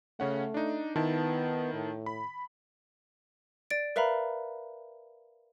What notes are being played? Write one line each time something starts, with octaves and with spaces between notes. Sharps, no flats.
C#3 A3 C#4 F#5
D4 D#4
D#3 B3 E4 A5
A2
B5
D5 A6 D7
A#4 B4 E5 F5 A#5 B5